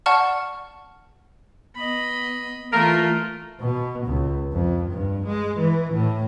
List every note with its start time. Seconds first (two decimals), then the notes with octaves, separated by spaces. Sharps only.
0.06 D5 F#5 A5 C#6 F6
1.76 B3 D#5 B5
2.73 E3 A3 F4 A#4
3.61 B2
4.06 C#2
4.53 F2
4.90 G2
5.26 G#3
5.58 E3
5.93 A2